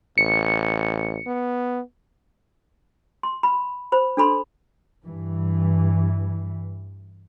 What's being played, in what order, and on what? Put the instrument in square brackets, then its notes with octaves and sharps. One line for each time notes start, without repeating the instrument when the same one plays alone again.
[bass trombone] A1 [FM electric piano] C#7
[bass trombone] B3
[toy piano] C6
B5
C5 B5
D4 A4 B5 C6
[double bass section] G2 E3